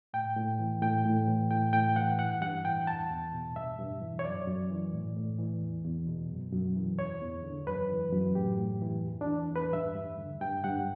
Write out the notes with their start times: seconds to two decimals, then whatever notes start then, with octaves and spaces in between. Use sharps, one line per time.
0.14 A2 G5
0.37 A2
0.59 E3
0.82 A2 G5
1.05 A2
1.27 E3
1.51 A2 G5
1.73 A2 G5
1.96 E3 F#5
2.19 G2 F#5
2.42 G2 F#5
2.65 E3 G5
2.87 E2 A5
3.10 E2
3.33 B2
3.56 G2 E5
3.79 G2
4.02 E3
4.19 C#5
4.24 F#2 D5
4.47 F#2
4.71 E3
4.93 A2
5.16 A2
5.39 E3
5.61 E2
5.84 E2
6.07 B2
6.30 F#2
6.53 F#2
6.76 E3
6.99 E2 C#5
7.22 E2
7.44 D3
7.67 F#2 B4
7.90 E3
8.12 F#2
8.35 A2 G4
8.58 A2
8.82 E3
9.04 E2
9.21 D4
9.27 E3
9.50 E2
9.56 B4
9.73 G2 E5
9.95 G2
10.18 D3
10.41 G2 G5
10.64 G2 F#5